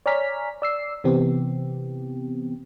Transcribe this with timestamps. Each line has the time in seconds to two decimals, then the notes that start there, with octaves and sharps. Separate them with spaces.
0.06 C#5 D5 G#5 A#5 F6 B6
0.62 D5 E6 C7
1.04 C3 E3 B3 C4 G4